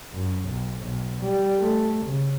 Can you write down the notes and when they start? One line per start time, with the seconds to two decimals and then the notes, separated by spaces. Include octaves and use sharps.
0.14 F#2
0.49 B1
0.83 B1
1.22 G3
1.60 A3
2.06 C#3